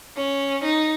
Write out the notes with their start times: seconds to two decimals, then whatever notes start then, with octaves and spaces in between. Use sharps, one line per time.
0.17 C#4
0.63 D#4